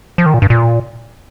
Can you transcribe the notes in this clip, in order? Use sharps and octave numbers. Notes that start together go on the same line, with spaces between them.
F3
D#3
A#2
G2
A#2